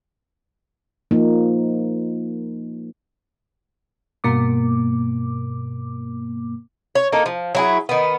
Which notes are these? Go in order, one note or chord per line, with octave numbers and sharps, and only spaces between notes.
F3 A#3 D#4
G2 B2 A#3 D6
C#5
A#3 D#4 A4
F3
F#3 E4 G#4
D#3 B3